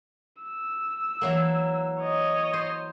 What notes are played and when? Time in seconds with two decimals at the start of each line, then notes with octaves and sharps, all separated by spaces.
0.43 E6
1.21 E3 F#3 A#3
2.01 C#5 D#5
2.53 C5